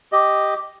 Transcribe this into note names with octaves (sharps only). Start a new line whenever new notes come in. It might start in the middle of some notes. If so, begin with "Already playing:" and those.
G4 D#5